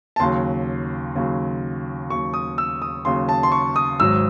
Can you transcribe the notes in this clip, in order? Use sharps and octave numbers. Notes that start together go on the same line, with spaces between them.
A5
D#2 C#3 F#3 C6
D#2 C#3 F#3
D#2 C#3 F#3 C#6
D#6
E6
D#6
D#2 C#3 F#3 C6
A5
C6
C#6
D#6
G#1 G#2 F#3 E6